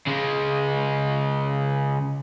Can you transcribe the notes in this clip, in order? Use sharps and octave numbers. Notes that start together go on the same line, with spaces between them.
C#3 G#3